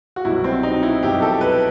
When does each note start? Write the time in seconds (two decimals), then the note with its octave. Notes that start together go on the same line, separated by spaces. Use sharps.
0.16 F#4
0.25 C2 B2 F#3 E4
0.44 C4
0.63 D#4
0.83 E4
1.02 C2 B2 F#3 G4
1.22 A4
1.41 B4